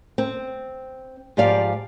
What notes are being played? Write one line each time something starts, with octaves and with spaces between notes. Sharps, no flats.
C4
G#2 F3 G4 D5 F5